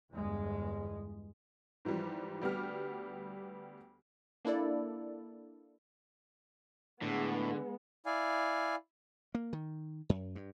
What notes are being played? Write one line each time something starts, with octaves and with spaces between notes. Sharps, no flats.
G1 E2 G#3
G#2 E3 F3 G3
D2 G3 B3 G4 F6
A#3 D4 E4 A4 D5
A2 D3 G#3 B3
E4 D5 F5 G#5
A#3
D#3
F#2
G2